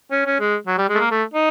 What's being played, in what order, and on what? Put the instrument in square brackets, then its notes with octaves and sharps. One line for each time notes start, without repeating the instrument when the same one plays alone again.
[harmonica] C#4
C#4
G#3
F#3
G3
G#3
A3
A#3
A3
D#4